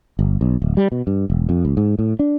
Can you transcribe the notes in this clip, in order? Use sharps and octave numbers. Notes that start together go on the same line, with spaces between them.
G1
B1
D1
G3
B2
G2
E1
F2
C#2
G#2
A2
D4